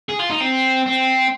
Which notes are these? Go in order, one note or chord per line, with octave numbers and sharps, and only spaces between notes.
G#4
F4
D#4
C4
C4